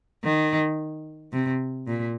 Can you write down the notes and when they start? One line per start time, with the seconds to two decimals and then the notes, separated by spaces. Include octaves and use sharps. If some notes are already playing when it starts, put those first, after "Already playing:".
0.24 D#3
1.33 C3
1.87 A#2